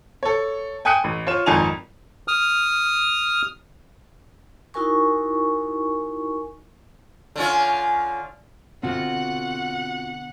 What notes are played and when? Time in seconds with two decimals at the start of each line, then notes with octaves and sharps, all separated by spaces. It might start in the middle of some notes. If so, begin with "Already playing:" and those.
0.23 A4 C#5
0.85 G5 G#5 D#6 F#6 C#7 D#7
1.04 A1
1.27 F4 C#5 E7
1.46 G#1 F2 D#4 G#5 A5 F7
2.28 D#6 F6
4.74 D#4 E4 F#4 A#4 G#5 C#6
7.36 D3 C#4 F4
8.83 B2 D3 C4 F4 F#4 F#5